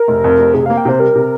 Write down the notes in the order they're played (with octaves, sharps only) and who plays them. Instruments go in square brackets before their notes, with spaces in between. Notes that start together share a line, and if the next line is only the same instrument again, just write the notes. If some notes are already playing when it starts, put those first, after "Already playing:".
Already playing: [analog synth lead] A#4
[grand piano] F1
F2
F1
[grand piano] C3 [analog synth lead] G#4
[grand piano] A#3 [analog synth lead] F5
[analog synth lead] G5
[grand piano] C3 [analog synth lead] C5
[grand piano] G3 [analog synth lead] A#4
[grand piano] C3